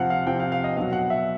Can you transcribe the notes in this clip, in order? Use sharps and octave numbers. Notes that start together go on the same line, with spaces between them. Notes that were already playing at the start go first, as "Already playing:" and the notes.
Already playing: C3 F3 F5 F#5
F5
C3 F3 G5
F5
F5
D#5
B2 F#3 F5
F#5
E5